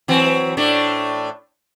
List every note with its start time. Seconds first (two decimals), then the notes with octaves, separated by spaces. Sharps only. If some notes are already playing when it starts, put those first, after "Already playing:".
0.08 E3 F#3 C4
0.57 A2 A3 D4